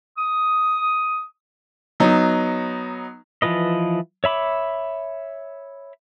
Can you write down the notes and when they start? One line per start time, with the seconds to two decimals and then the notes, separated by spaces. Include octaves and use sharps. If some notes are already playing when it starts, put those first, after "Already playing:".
0.18 D#6
2.00 F#3 B3 D#4
3.42 E3 F3 F4 B4 D#5
4.24 C#5 E5 B5 D6